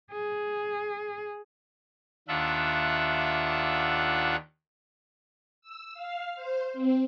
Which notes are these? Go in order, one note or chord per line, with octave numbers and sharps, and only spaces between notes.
G#4
D#2 D4 F4 E5 F#5
E6
F5
C5
C4